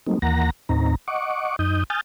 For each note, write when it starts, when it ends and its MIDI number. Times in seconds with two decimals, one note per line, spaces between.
0.07 0.19 54
0.07 0.19 55
0.07 0.19 57
0.07 0.19 58
0.07 0.19 60
0.07 0.19 63
0.22 0.50 39
0.22 0.50 52
0.22 0.50 58
0.22 0.50 78
0.22 0.50 82
0.22 0.50 94
0.69 0.95 39
0.69 0.95 45
0.69 0.95 60
0.69 0.95 63
0.69 0.95 82
1.08 1.56 75
1.08 1.56 78
1.08 1.56 85
1.08 1.56 86
1.59 1.84 42
1.59 1.84 63
1.59 1.84 87
1.59 1.84 91
1.90 2.01 80
1.90 2.01 87
1.90 2.01 89
1.90 2.01 91
1.90 2.01 93